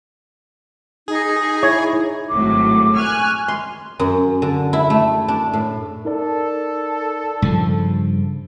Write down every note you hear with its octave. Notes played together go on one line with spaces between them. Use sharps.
D#4 G#4
E4 C#5
G#1 A2 F#3 D6
G#5 C#6 F6 F#6
C6
F#2
D3
E4
A3
D4
A2
D#4 A4 A#4 D5
G2 C#3 F3